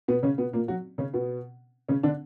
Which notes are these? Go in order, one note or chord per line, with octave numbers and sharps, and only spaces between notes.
B2 B3
C#3 C#4
B2 B3
A#2 A#3
F#3 F#4
C#3 C#4
B2 B3
C#3 C#4
D3 D4